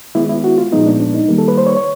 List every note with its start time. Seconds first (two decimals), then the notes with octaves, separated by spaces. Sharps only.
0.15 D#3 G#3 B3 E4
0.29 E4
0.44 F#4
0.58 F4
0.72 A#2 F3 G#3 B3 D#4
0.86 D4
1.00 D4
1.15 D#4
1.28 D#3 G3 A#3
1.38 A4
1.48 B4
1.58 C5
1.67 C#5
1.77 C#5